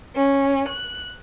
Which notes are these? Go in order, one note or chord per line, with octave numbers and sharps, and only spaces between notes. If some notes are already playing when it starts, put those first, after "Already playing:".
C#4
F#6